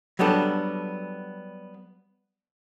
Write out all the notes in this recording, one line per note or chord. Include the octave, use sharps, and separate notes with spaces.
F#3 G3 B3 D4 A4